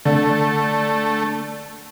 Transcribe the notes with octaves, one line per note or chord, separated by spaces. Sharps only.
D3 A3